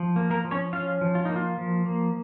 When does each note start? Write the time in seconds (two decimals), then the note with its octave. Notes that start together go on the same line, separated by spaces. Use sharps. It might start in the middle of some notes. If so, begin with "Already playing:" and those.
Already playing: F3
0.16 A#3
0.30 A#3 A#4
0.45 F3
0.51 C#4 C#5
0.73 C#4 F4 F5
1.01 F3
1.15 F4
1.25 A#3 D#4
1.36 F4
1.58 F3
1.86 A#3